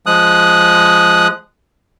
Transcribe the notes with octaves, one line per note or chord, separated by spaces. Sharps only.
F3 G#3 D#6 F#6